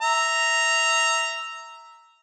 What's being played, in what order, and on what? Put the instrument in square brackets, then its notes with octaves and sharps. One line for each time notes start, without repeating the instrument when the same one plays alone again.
[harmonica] E5 A#5